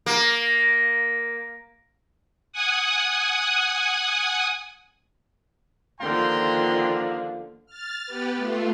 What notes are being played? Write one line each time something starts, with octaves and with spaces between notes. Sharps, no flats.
A#3
F#5 G#5 D#6
D#2 D3 F3 F4 G5 A#5 C6
F6 A6
B3 G4 B4
A3 F4